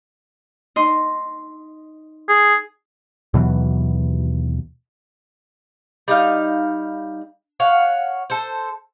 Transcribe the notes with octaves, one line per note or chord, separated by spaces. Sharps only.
D#4 D#5 C6
G#4
D#2 B2 E3 F#3
G3 D#4 F5
C#5 F5 F#5
A4 C5